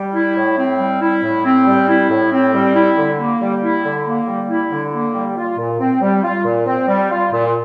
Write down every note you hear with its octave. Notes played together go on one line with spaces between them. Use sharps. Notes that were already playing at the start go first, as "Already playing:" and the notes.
Already playing: G3
E4
A2
C4
G3
E4
A2
C4
G3
E4
A2
C4
G3
E4
D3
A#3
G3
E4
D3
A#3
G3
E4
D3
A#3
G3
F4
A#2
C4
G3
F4
A#2
C4
G3
F4
A#2